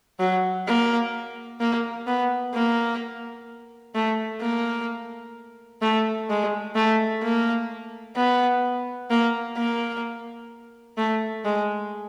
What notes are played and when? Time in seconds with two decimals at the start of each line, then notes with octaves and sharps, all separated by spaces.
0.20 F#3
0.67 A#3
1.60 A#3
2.07 B3
2.54 A#3
3.95 A3
4.41 A#3
5.82 A3
6.30 G#3
6.75 A3
7.23 A#3
8.16 B3
9.11 A#3
9.57 A#3
10.97 A3
11.45 G#3